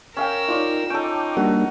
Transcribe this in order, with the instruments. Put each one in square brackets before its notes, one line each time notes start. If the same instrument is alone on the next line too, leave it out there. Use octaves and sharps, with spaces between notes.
[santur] C#4 F5 G5 [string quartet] A#4 E6
[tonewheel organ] D#4 [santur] F4 C#5 D5
[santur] C#4 A4 [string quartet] D#4 [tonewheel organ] G5 D6
[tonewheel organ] G3 A#3 D4 [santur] F#4